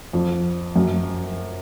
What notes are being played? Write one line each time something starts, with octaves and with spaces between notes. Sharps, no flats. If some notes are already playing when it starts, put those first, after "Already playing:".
F2
F#2